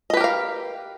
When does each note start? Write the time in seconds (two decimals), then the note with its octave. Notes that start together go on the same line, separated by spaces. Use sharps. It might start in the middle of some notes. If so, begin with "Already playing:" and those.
0.10 D#5
0.13 B4
0.17 G4
0.21 A#4
0.24 F5